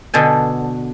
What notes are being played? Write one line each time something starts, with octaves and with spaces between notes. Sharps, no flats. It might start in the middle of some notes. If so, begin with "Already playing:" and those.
B2 D3 A4 G#5